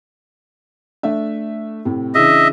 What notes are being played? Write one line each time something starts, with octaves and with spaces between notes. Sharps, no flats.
A3 D4 E5
A2 C3
C#3 E3 D4 D#5 E5